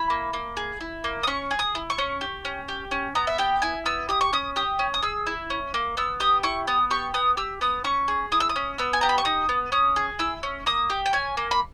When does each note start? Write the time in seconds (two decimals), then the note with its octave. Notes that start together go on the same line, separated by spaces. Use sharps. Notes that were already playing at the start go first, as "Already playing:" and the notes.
Already playing: E4 B5
0.10 A#3
0.33 A#3
0.57 G#4
0.81 E4
1.04 A#3
1.23 D#6
1.27 C#4 C#6
1.51 G#4
1.59 D#6
1.75 E4
1.90 C#6
1.98 C#4
2.21 G4
2.45 C#4
2.68 G4
2.91 C#4
3.15 B3 A#5
3.27 E5
3.38 G4 G5
3.62 E4 G#5
3.86 B3 E6
4.09 G4 D#6
4.21 C#6
4.33 C#4 D#6
4.56 G4 D#6
4.79 C#4
4.94 D#6
5.02 G#4 E6
5.27 E4
5.50 C#4
5.74 A#3
5.97 B3 E6
6.20 G4 D#6
6.43 E4 C#6
6.67 B3 D#6
6.91 G4 C#6
7.14 B3 D#6
7.37 G4 E6
7.61 B3 D#6
7.84 C#4 C#6
8.08 G#4
8.32 E4 D#6
8.40 E6
8.49 D#6
8.56 C#4
8.78 B3 E6
8.93 G#5
9.01 G4 A#5
9.09 B5
9.18 C#6
9.25 D#4 D#6
9.49 B3
9.72 C#4 D#6
9.96 G#4
10.19 E4 E6
10.43 C#4
10.66 A#3 D#6
10.90 G4
11.06 G5
11.13 C#4 G#5
11.37 A#3
11.51 B5